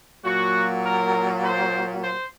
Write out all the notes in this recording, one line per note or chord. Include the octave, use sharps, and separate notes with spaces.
A#2 F#3 A#3 F#4
A#4
C5
C5